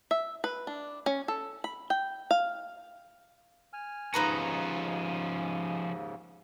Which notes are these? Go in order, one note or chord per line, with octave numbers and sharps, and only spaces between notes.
E5
B4
D4
C#4
A4
B5
G5
F5
G#5 F6
D#2 G#2 C#3 F3 C#4 D#4 B4 A#5